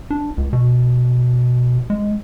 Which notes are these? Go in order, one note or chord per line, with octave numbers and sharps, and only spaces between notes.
D4
C#2
B2
G#3